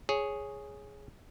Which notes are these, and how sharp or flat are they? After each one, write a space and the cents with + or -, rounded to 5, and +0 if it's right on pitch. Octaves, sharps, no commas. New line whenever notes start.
G#4 +0 C#5 +0